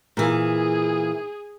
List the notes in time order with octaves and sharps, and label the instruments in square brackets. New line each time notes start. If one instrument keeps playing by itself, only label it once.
[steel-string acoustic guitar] A#2 E3 [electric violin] G#4